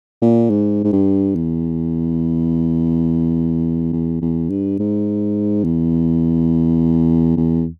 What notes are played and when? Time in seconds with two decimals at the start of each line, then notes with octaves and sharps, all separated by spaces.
0.22 A#2
0.50 G#2
0.84 G#2
0.92 G2
1.35 E2
3.93 E2
4.21 E2
4.50 G2
4.79 G#2
5.64 E2
7.37 E2